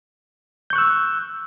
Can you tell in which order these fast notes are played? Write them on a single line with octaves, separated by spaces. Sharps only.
G6 C#6 F#6 E6